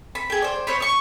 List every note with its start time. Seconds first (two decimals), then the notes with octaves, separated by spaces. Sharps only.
0.15 B5
0.30 G#4 G5
0.42 C5 D5
0.67 C5 C#5 B5
0.80 D#5 C#6